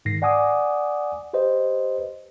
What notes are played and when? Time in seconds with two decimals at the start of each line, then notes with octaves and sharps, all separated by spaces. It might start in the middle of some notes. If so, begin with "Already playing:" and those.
0.05 G#2 D#3 A#6 C7
0.22 D5 F#5 G#5 D6 D#6
1.33 G4 B4 C5 D#5